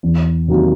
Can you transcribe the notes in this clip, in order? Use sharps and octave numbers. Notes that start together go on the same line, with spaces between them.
E2
C3 D#3 F#3 A#3